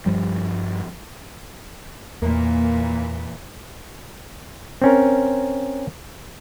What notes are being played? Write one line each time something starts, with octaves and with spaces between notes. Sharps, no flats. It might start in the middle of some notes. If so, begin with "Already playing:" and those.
G2 F3 G3
E2 A#2 E3 A#3
C4 C#4 A#4